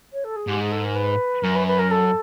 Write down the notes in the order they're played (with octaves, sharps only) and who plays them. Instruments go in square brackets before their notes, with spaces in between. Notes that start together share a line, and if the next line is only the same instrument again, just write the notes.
[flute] C#5
A4
G#4
[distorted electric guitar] G#2 [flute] G4
[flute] G#4
A4
A#4
B4
[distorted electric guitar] F#2 [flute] A#4
[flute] B4
B4
A#4
A4